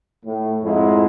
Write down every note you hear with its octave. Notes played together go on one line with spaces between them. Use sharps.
A2
F2 G#2 G#3 E4